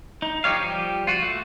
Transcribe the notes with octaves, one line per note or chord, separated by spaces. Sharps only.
D#4
F3 D#4 G4 C#5 F5
F3 G3 G4
F4 F#4
A3 F#4